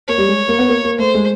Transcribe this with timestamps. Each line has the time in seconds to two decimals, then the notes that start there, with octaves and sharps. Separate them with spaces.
0.08 A#3 C#5
0.18 G3
0.28 G#3
0.48 A#3
0.59 B3
0.68 A#3
0.84 A#3
0.99 A3 C5
1.14 G#3